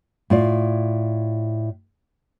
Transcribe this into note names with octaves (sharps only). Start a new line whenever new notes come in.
A2 F4 D5